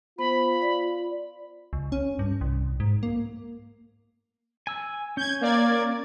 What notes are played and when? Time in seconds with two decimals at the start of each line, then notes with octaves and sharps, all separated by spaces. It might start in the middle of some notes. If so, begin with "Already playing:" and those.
0.19 B3 F4 C5 B5
0.62 D5
1.73 C#2
1.92 C#4
2.19 G2
2.41 C2
2.80 G#2
3.03 A#3
4.67 G#5 E6
5.17 C#4 G6 G#6
5.41 A#3 D5 G#6